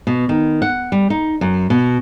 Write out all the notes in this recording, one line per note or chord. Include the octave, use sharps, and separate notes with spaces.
B2
D#3
F#5
G3
D#4
F#2
B2